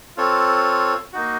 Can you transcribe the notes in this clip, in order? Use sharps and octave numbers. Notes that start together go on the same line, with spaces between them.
C4 F4 A4 C#5
A#3 D#4 F#4